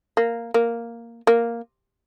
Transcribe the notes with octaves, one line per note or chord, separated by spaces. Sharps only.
A#3
A#3
A#3